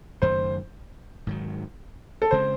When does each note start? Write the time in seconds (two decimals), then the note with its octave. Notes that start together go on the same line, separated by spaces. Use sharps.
0.22 F#1 F#2 D#3 A3 C5
1.27 G#2 D#3 F#3
2.22 A4
2.31 C#3 G#3 C4 C5